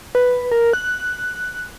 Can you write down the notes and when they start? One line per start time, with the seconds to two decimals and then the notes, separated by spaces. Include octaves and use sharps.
0.15 B4
0.52 A#4
0.73 F#6